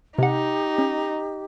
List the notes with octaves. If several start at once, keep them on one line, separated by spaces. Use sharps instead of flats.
C3 D#4 G4 F#5
C#4